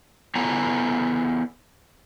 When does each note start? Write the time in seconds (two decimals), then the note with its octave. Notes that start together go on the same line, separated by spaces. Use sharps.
0.35 B3 E4 A4 C#5 G#5 A#5